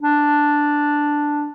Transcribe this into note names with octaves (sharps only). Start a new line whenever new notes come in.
D4